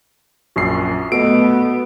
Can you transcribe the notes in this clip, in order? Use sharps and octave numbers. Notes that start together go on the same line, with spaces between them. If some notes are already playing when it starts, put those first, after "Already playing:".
A#1 F#2 F#4 C7
B2 A3 B3 A4 D#5 D7